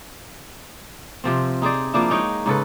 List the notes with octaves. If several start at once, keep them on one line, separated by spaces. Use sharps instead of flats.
C3 F3 C4
D#4 G#4 C5 D5
F3 A#3 D4 E4
G#3 D#4 C#5 G5
G#2 C#3 A4 B4